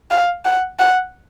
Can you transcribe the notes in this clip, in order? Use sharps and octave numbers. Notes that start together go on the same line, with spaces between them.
F5
F#5
F#5